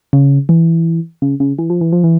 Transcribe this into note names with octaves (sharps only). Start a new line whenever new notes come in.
C#3
E3
C#3
C#3
E3
F3
E3
F3
E3